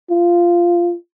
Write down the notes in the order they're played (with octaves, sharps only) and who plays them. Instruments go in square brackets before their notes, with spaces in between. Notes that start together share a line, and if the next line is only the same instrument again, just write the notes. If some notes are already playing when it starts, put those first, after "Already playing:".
[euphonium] F4